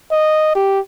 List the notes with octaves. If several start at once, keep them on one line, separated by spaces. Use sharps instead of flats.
D#5
G4